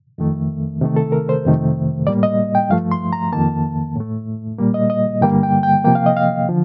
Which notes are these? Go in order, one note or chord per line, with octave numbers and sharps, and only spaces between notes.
F2 D#3 A3
C3 D#3 A3
A4
A#4
C5
F2 C3 D#3 A3
A2 G3 A#3 D5
D#5
G5
G2 F3 A3 F5
C6
A#5
F2 D#3 A#3 A5
A2 A3
A#2 G3 A#3
D#5
D#5
G2 D3 G3 A#3 G5
G5
G5
C3 F3 A#3 G5
F5
D#5
F5
D3 F3